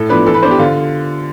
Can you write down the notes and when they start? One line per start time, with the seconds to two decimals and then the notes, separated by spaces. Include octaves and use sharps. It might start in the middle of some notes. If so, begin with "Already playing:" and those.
Already playing: A2 A4
0.09 F3 B3 D4 B4
0.26 E3 A4
0.34 B4
0.42 B3 D4 C5
0.51 G4
0.59 D3 F4